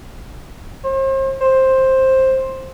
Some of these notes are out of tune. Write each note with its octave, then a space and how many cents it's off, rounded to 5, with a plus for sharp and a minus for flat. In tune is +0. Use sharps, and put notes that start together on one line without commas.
C5 +40
C5 +10